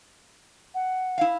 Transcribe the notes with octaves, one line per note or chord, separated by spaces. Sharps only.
F#5
E4 F5